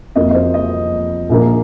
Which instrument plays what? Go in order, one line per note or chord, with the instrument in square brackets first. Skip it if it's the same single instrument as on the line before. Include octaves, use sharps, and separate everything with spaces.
[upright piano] F2 F3 A#3 D#5
D#5
C5
D#5
A#1 A#2 A#3